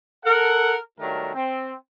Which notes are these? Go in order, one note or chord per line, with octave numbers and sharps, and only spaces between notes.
A4 A#4 F#5
G2 D#3 F#3 A3 D4 A#4
C4